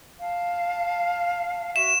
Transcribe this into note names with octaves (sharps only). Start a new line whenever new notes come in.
F5 A5
F#4 E5 C#6 E7